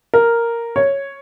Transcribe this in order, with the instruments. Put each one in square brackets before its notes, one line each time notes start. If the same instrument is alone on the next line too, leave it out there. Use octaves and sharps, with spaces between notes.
[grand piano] A#4
C#5